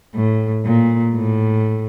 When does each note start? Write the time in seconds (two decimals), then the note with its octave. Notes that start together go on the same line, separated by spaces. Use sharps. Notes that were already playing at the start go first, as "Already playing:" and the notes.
0.15 A2
0.65 A#2
1.15 A2